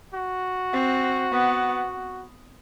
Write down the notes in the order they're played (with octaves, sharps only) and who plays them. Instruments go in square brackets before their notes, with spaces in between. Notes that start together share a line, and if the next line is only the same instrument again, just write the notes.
[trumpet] F#4
[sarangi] C4
B3